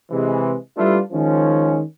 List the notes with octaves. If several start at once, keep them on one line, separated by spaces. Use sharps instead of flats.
C3 E3 G#3
G3 A3 D4 E4 F4 B4
D#3 F3 G#3 C#4